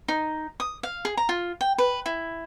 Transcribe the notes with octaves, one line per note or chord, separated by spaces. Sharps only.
D#4
D#6
F5
G#4
A#5
F4
G5
B4
E4